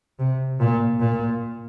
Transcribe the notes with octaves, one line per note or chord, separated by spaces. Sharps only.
C3
A#2
A#2